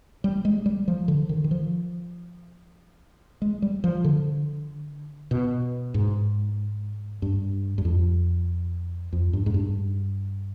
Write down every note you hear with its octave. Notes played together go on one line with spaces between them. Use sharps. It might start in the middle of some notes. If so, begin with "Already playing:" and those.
G3
G#3
G3
F3
D3
D#3
D#3
F3
G#3
G3
F3
D3
B2
G#2
G2
G2
F2
F2
G2
G#2
G2